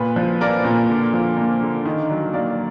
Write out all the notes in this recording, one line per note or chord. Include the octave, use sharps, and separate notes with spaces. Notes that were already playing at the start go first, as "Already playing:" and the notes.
Already playing: A#2 B4
F3
A#3 A#4 D5
A#2
D3
F3
A#3
D3
D#3
F#3
A#3 D5 F5